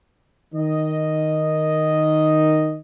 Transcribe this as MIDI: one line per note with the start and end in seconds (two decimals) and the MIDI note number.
0.55 2.77 51
0.55 2.77 75